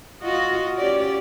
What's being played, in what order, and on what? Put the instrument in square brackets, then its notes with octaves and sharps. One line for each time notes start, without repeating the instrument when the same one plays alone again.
[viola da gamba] F4 F#4 D#5
C#4 G4 D5